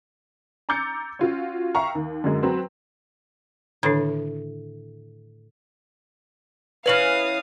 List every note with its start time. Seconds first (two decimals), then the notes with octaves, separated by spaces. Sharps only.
0.69 A#5 D6 E6 G6 A6 C#7
1.19 C#4 F4 F#4
1.75 E5 F5 G5 A#5 C#6
1.95 D#2
2.24 F#2 D3 F#3 G#3
2.43 F#3 C4 B4
3.83 A2 D3 D#3 D4
6.86 E3 C#4 B4 F5 G#5 D#6 F#7